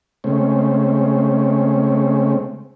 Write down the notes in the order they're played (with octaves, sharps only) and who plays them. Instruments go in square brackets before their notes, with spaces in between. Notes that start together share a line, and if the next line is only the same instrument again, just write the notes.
[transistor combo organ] C#3 G#3 A3 C4 C#4